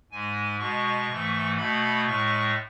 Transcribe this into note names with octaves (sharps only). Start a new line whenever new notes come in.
G#2 G#3 G#5
B2 G#3 C#6
G#2 E3 A3
B2 A3 B5
A2 G#3 C#6